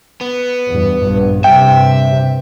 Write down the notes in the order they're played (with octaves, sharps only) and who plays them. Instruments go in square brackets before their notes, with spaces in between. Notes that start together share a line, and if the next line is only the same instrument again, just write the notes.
[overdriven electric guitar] B3
[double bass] E2 G2
A#1 G2
[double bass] G2 C3 [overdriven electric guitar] E5 [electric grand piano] G5